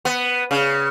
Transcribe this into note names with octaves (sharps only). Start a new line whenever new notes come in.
B3
C#3